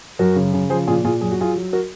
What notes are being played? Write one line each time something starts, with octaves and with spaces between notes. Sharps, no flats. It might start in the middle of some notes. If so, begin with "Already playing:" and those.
F#2 F#4 A#4
C#3
C#3
F3 G#4 C5
A#2 F4 G#4
A#2 F4 G#4
F#2 G#4
F#4
F#3 F4 G#4
F#3
F#4 A#4